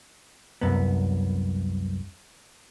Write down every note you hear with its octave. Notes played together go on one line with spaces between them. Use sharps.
C2 F#2 B3